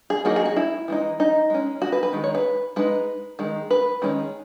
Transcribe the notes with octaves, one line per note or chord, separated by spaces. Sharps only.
G#4
F#3 A#3 D#4 F#4
G#4
F#4
E4
E3 G#3 D#4
D#4
G#3 C#4
F#4
B4
B4
D#3 G#3
C#5
B4
G#3 D#4 B4
D#3 G#3
B4
D#3 G#3 C#4